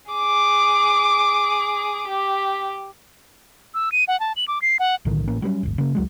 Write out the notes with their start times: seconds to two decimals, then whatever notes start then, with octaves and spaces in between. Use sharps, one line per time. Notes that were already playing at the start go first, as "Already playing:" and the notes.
0.11 G#4 D6
2.08 G4
3.74 E6
3.92 D#7
4.08 F#5
4.20 A5
4.36 F#7
4.48 D6
4.62 C7
4.80 F#5
5.05 B1 A2 D3 D#3
5.28 A1 A#3 C#4
5.42 F#3 G3 B3 C#4
5.63 D1 G1
5.78 C#3 A#3
5.95 C#2 F#3 G#3